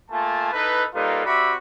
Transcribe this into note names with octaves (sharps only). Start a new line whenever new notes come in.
A3 A#3 F4 G#5 A5
D#4 E4 A4 B4
G3 A#3 D#4 F4 A4 B4
C4 F#4 G4 D5 E5 B5